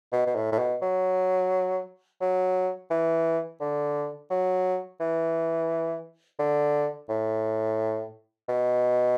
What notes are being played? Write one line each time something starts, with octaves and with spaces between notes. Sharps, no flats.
B2
B2
A2
A2
B2
F#3
F#3
E3
D3
F#3
E3
D3
A2
B2